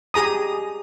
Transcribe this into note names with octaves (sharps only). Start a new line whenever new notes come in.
G4 G#4 A#5 D#6